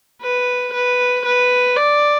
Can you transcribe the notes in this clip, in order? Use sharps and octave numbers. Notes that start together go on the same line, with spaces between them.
B4
B4
B4
D5